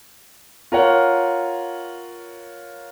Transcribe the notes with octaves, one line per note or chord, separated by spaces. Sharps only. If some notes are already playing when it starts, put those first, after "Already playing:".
F4 A#4 C#5 F#5